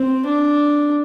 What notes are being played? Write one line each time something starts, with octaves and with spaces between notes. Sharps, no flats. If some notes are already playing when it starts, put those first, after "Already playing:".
Already playing: C4
D4